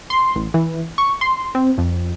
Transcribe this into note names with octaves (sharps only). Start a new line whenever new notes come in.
C6
A1
E3
C#6
C6
C4
F2